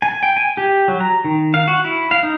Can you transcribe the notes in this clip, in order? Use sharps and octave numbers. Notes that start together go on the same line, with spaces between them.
G#5
G5
G#5
G4
F#3
A#5
D#3
F5
F#4
E4
F5
D#4